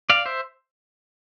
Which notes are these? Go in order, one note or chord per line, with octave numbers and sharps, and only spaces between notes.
D5 F5
C5 E5